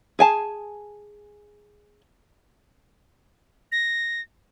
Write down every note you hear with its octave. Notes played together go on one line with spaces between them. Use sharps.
G#4 G#5 A5
A#6